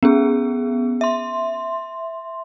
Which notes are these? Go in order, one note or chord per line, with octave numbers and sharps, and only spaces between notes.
B3 C#4 G#4
E5 C6